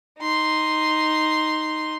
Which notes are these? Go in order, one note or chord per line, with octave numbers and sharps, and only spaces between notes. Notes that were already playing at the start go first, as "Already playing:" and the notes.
D#4 C6